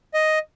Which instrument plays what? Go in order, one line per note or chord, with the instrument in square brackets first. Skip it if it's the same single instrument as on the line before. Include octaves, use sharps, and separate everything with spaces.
[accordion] D#5